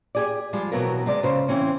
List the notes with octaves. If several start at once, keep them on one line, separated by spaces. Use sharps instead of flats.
G4 G#4 D5
F3 G3 G#3 F4
B2 E3 F#3 B3 C4 A#4
C3 G#3 D5
C#3 C5
E3 C4 C#4